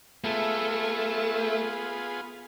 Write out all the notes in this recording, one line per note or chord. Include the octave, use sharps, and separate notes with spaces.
A3 B3 F4 G#4